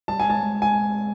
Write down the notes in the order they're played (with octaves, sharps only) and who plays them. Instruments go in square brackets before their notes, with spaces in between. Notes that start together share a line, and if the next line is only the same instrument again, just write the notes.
[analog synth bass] G3 [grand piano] A5
[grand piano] G#5
[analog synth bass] G#3 [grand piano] A5
[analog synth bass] G#3
[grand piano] G#5